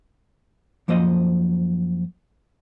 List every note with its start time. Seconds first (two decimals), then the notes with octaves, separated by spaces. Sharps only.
0.88 F#2 F3 A#3 C5 D#5